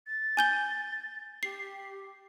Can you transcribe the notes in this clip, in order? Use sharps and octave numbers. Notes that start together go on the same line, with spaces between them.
A6
G#5 G6 G7
G4 C7